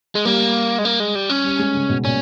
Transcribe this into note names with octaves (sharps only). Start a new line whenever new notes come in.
G#3
G3 A#3
G#3
A#3
G#3
G3
C#4
G3
G#3
C#3
B2
A#2 C#4